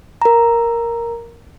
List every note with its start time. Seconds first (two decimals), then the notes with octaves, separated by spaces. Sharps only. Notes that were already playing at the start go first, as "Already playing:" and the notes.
0.22 A#4 A#5